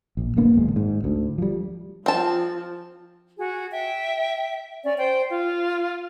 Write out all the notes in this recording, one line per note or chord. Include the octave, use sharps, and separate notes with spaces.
A#1
F#1 D3 A#3 B3
D1 G#1 G#3
G#1 G#2
D2
F3 G3
F3 C4 A5
F#4 G#4
E5 G5
C#4 D5
C5 G5
F4